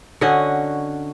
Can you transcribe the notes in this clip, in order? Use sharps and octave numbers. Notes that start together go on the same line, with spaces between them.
D3 C#4 F#4 D#5